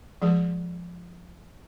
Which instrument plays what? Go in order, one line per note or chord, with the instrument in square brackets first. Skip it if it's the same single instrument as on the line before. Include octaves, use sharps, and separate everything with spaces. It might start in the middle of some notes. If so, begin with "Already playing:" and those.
[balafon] F3 G#3 G#4